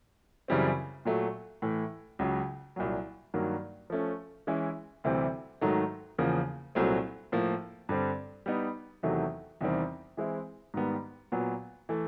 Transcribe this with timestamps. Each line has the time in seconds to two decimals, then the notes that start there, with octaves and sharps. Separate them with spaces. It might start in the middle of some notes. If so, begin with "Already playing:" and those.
0.48 F#2 C#3 E3 G3 C4
1.05 A#2 F#3 A3
1.62 A2 E3 A3
2.19 C#2 C#3 F#3
2.76 C2 A#2 F#3
3.34 G2 D#3 F#3 A#3
3.90 F3 A3 C#4
4.47 E3 G#3 C#4 E4
5.04 D2 C3 E3 G3 C4
5.61 G#2 D#3 F#3 A3
6.18 E2 C#3 F3 A#3
6.75 C2 A#2 F#3 A3 C4
7.32 A2 F3 A#3
7.89 G2 D3 G3 C4
8.46 G3 B3 D#4
9.03 E2 C3 D#3 F#3 A3
9.61 E2 C3 D#3 G3 C4
10.17 E3 G#3 C4 E4
10.74 G#2 D#3 G3 B3
11.32 A#2 F#3 B3
11.89 E3 A3